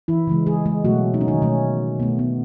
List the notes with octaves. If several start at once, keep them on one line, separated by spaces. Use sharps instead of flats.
E3 E4
C#3 E3 G#3
G#3 G#4
G#3 G#4
B2 F#3 A3 F#4
D#4
C#4
D#3 D#4
B2 A3 C#4
B2 A3 B3
B3